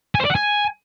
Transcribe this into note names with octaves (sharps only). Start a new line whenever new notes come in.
G#5
C5
D5
F#5
G#5